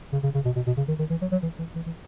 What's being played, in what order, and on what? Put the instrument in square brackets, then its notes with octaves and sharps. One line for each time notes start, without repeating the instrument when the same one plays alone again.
[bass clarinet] C#3
C#3
C#3
B2
B2
B2
C#3
D#3
D#3
E3
F#3
F#3
E3
E3
E3
E3